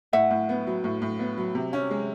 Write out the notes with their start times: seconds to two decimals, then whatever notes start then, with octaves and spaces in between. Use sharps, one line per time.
0.13 A2 E5 F#5
0.31 A2
0.49 B3
0.67 F#3
0.84 A2
1.02 A2
1.19 B3
1.37 F#3
1.55 C3
1.73 C#4
1.91 G#3